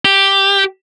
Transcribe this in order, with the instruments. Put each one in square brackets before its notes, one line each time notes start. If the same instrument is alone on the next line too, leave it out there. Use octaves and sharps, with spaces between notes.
[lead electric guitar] G4